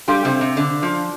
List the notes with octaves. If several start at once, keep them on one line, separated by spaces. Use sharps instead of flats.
G3 D4 G4 A4 F5 C6
C3 C4
C3
D3
F3